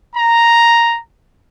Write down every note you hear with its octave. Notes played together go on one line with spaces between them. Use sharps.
A#5